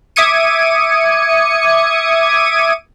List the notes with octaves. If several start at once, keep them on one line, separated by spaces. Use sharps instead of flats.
E5 D6 D#6 G#6 C#7 D#7